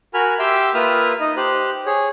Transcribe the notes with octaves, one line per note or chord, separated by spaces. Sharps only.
F#4 A#4 G#5 B5 F6
G4 E5 G5 C6 E6
A#3 F4 B4 E5 D#6 F6
D#4 D#5
G4 C5 F#6
G#4 C#5